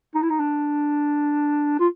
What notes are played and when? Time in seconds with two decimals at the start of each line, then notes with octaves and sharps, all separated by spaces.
0.15 D#4
0.22 E4
0.30 D#4
0.40 D4
1.80 F4